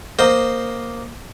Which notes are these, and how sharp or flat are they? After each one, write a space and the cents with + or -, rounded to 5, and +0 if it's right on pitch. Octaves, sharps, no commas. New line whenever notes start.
A#3 +0 C5 +0 D#5 -15